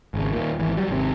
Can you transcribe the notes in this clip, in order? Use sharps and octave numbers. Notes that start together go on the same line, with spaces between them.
G#1 C#3
D#2 A#2
G#1 E3
F#3 G3
G#1 C3 C4